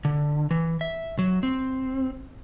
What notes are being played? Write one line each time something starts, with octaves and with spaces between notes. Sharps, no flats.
D3
E3
E5
F#3
C4